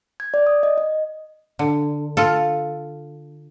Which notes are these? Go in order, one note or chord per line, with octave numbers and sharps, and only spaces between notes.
G#6
D5
D#6
D#5
D#5
D3
F4 A4